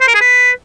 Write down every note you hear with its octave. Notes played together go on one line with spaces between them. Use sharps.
C5
A#4
G#4
B4